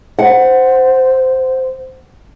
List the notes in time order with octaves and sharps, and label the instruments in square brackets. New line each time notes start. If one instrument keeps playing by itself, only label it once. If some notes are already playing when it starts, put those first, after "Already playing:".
[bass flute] C5 [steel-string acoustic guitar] F#5